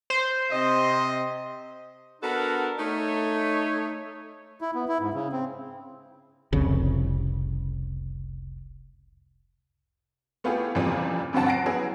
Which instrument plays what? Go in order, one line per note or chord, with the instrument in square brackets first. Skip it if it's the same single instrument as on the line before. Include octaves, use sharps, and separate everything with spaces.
[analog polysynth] C5
[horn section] C3 D#5
B3 D4 F#4 A4 A#4
A3 D#4 C#5
[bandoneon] E4
B3
E4
G#2
C#3
C4
[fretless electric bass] F1 C2 C#3
[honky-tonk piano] A3 B3 E4 F4 G4 G#4
F2 A#2 C#3 E3 F3 G3
D2 G2 F#3 C4 F#5 A5
F#5 A5 A#6 C7 D7
F#3 B3 C#4 E4 G#4